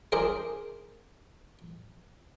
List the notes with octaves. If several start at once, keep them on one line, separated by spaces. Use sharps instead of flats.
D4 G#4 A#4 C5